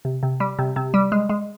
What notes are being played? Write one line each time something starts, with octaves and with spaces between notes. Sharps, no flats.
C3
C3
G3
C3
C3
G3
G#3
G#3